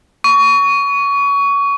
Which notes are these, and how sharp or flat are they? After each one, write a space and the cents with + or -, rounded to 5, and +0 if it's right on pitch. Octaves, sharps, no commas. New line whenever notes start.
C#6 +25